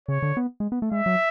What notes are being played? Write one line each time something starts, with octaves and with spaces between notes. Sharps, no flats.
C#3 C#5
D3
B3
G#3
B3
A3
G#3 E5
F#3